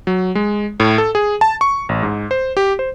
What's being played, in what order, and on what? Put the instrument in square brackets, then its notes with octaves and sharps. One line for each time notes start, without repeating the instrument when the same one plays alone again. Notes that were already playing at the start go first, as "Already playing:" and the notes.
[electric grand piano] F#3
G#3
A2
A4
G#4
A5
C#6
A1
G#2
C5
G4
C5